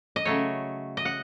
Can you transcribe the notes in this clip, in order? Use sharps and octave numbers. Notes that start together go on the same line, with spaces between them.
D#5
C#3 F#3 A3 C#5
D#5
F#5